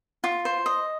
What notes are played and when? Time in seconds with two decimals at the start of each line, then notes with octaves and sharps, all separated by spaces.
0.24 F4
0.45 C5
0.66 D#5